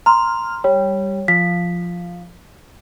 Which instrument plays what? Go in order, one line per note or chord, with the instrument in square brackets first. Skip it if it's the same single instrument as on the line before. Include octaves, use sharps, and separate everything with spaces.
[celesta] A#5 C6 [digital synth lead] F6
[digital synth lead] G3 [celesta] C#5
[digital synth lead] F3 [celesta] B6